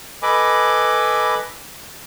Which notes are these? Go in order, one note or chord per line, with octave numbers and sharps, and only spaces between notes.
A4 B4 D#5 G#5 B5 D6